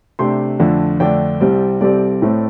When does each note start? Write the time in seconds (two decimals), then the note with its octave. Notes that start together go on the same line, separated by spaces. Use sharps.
0.19 C3 A3 D4 G5 C6
0.60 F2 D3 A3 D4
1.00 F2 D3 A3 D4 D5 G5
1.41 C2 C3 G3 C4
1.81 C2 C3 G3 C4 A4 D5
2.22 A2 A3 C4